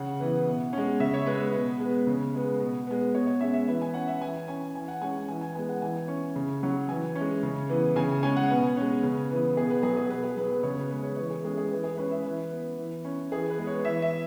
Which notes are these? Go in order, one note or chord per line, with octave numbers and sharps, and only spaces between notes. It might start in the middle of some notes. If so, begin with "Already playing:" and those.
Already playing: C#3 F#5
E3 B3
B2
G#3 C#4
C#3 E5
C#5
G#3 B3 B4
B4
B2
G#3
B3
C#3
G#3 B3
B2
G#3 B3
B2 C#5
C#5
G#3 C#4 E5
E5
E3 B4
G#5
C#4 F#5
E5
E3 G#5
C#4 G#5
E3 G#5
F#5
G#3 C#4 G#5
E3 G#5
G#5
G#3 B3 G#5
F#5
E3 G#5
C#4
C#3
F#3 C#4
E3 G#5
C#4
G#3
C#3
E3 B3
C#3 G#5
G#3 C#4 G#5
F#5
B2 B4
G#3 C#4
C#3
E3 B3
B2 G#4
B4
F#3 B3 G#4
G#4
B2 B4
G#4
F#3 B3 B4
B4
C#3 C#5
B4
G#3 B3 B4
C#5
E3 C#5
G#4
G#3 C#4 G#4
G#4
E3 B4
G#4
G#3 C#4 B4
E5
E3 B4
B3
E3
C#4
E3 G#4
B4
G#3 B3
C#5
E3 E5
E5